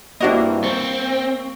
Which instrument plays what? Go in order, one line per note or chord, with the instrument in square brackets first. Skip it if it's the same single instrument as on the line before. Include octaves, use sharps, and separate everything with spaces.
[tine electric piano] G2 C4 E4 [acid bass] A#3 [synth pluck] D4 F#4 D#5
[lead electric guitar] C4 [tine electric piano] C#6